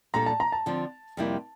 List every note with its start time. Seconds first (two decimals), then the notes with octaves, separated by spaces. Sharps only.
0.14 A#2 G3 D4 A4 A#5
0.26 A5
0.40 A#5
0.52 A5
0.66 D3 F3 C4
1.17 F2 C3 G3 A#3 E4